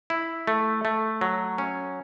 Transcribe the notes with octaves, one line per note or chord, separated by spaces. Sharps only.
E4
A3
A3
F#3
C#4